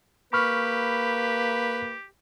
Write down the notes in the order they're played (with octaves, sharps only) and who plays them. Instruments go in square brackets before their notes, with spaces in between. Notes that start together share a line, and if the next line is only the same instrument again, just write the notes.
[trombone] A#3 [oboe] G4 [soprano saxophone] B4 [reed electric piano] B5 C#6 F6